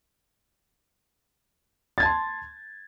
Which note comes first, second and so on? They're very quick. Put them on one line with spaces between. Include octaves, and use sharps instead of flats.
A6 G#6 A5 C6